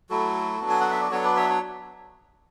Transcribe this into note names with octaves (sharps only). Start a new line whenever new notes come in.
F#3 A3 E4 F#4 A4
F#3 B3 D4
G#5
F#5
E5
D5
F#3 B3 D4 A4 C#5
B4 D5
C#5 E5
C#5